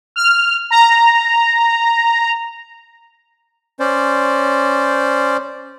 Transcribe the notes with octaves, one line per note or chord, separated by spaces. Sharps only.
F6
A#5
C#4 C5 D5